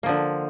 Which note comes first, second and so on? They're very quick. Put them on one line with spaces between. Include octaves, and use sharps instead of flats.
A#3 F3 D3